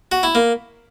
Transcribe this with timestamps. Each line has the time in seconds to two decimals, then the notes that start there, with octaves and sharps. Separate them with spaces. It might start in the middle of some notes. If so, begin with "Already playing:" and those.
0.12 F#4
0.23 E4
0.35 A#3